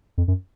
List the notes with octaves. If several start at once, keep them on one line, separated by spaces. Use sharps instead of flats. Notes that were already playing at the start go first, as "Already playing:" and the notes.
F2
F#2